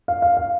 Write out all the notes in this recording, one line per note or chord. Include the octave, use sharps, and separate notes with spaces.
F5
F5
F5